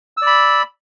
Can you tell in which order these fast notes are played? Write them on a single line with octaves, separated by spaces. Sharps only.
E6 D5 B5